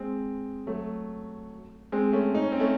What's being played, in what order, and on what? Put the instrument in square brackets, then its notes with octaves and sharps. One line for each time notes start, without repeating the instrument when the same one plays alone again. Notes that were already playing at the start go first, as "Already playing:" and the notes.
Already playing: [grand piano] G#3 C4
F#3 A3
G#3 C4
A3 C#4
D#4
C#4
C4
A3 C#4